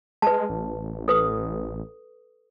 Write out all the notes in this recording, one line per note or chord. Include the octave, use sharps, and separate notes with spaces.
G#3 B4 A5
A1
A4 B4 D#6